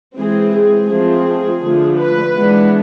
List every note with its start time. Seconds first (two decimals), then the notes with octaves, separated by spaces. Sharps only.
0.18 E3 G#3 C4 G#4
0.55 G#4
0.90 F3 A3 C4 G#4
1.63 D3 F3 A3
1.99 B4
2.34 E3 G#3 B3 D4